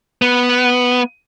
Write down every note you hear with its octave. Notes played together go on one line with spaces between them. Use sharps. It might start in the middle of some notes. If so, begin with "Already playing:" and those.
B3